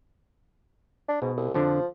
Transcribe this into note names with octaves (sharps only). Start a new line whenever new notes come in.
D4
G#2 B2
C2
F2 D3 F3 D4